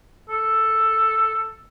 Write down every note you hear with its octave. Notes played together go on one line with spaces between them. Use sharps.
A4